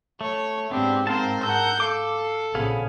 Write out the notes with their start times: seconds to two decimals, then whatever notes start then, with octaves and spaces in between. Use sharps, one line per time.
0.21 A3 C#5
0.71 G#2 B3 C4 D4 G4
1.07 C4 A#4 C5 F5 A5
1.43 A#4 F#5 A5 E6 G6
1.80 A4 F5 D6
2.55 A#1 C#3 B3 G#4 F5